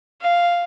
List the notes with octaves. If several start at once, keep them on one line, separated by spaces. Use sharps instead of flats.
F5